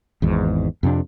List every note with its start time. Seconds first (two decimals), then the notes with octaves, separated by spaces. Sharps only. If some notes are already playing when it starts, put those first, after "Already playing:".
0.22 G#1 E2 G#2
0.83 F2 C3 D4